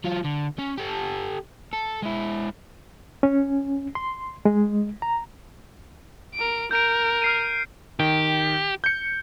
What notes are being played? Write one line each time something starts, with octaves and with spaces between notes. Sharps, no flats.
F#3 F4
D3
C#4
G4 A4
A4
G#3 E4
C#4
C6
G#3
A#5
A#4 D7
A#4 G6 D7
F6 C7 D#7
D#3 G4
G6 C#7